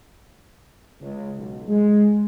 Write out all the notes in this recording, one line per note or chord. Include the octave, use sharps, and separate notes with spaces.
C#2
B1
G#3